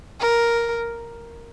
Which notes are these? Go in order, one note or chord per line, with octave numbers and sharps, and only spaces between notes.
A#4